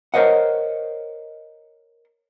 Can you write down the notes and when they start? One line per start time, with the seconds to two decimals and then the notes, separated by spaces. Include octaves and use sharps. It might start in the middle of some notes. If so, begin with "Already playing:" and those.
0.14 A#4 C5 C#5 D#5 F#5